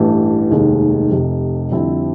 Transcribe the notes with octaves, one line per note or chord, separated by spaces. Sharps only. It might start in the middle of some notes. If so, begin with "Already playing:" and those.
Already playing: A1 G2 E3 A3
F1 D#2 D#3 G#3
F1 F2 C3
F2 D3 G3 C4 E4